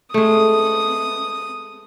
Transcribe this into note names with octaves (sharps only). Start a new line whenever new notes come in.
G#3 A3 D#6